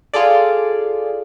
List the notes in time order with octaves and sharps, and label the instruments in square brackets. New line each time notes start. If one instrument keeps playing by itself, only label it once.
[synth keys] F4 G#4 A4 D5